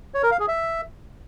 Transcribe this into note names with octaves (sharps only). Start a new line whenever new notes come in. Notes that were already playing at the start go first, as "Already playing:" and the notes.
C#5
A#4
F5
G#4
E5